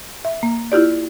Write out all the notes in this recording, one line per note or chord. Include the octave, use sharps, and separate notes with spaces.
E5
A#3
E4 F4 G4 D5